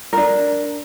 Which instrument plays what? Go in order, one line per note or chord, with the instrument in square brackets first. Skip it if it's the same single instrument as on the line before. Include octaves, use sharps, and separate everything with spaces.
[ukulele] D4 A#4